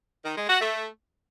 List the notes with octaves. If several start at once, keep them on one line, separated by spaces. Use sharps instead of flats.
D#3
G#3
F#4
A3